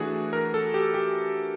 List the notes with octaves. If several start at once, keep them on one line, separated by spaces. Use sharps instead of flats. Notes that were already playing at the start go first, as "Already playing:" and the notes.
Already playing: E3 A3 D4 F#4 G#4
A#4
A4
G4
G4